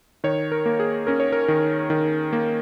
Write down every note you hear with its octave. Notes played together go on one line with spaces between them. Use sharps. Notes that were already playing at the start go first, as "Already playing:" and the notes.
D#3 C#5
A#4
A#3
G#4
C#4 A#4
C#5
A#4
D#3
D#3
A#3